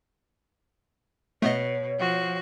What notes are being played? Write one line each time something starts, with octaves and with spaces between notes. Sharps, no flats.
B2 A3 B3 C#5 D#5
F3 F#4